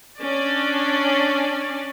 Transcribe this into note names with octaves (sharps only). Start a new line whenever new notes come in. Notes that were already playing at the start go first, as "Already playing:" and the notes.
C#4 D4 D5